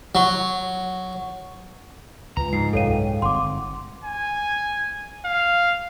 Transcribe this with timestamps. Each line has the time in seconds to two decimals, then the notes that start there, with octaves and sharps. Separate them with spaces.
0.15 F#3
2.37 C#2 G#3 F4 B4 A#5
2.53 G#2 F3 C7
2.73 C2 F#2 A4 C#5 F5 G5 D#7
3.22 G1 G#3 C4 F#5 C6 D6
4.04 G#5
5.25 F5